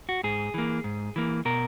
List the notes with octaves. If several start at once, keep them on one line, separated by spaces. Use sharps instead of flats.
F#4
G#2 G#4
E3 A#3
G#2
E3 A#3
B2 A#4